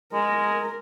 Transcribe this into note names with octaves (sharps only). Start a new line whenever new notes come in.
G#3 A#4